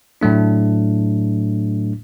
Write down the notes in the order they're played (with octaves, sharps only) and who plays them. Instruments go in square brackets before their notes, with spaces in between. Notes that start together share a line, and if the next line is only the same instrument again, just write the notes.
[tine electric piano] A2 F#3 A3 D4